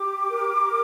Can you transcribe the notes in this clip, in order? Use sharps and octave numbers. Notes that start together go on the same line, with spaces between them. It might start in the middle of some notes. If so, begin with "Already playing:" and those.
Already playing: G4 D6
A#4